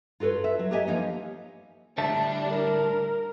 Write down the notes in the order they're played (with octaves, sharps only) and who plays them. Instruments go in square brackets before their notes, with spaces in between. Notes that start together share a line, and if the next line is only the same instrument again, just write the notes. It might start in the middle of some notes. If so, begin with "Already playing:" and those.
[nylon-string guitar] F4 F#4 A4 B4 C#5
E5
F#3
G4 B4 C#5 D#5 E5 G#5
E3 F3 A#3 C#4 D#4
[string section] A2 G3 D4 [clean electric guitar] D3 E5 A5
[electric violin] A#4